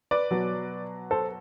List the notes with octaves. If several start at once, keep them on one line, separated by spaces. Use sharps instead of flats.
B4 D5
B2 F#3
A4 C5